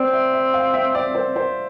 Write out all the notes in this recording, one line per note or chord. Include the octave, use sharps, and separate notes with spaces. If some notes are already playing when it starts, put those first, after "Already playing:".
Already playing: C4 D5
E5
E5
F5
E5
D5
C5
C5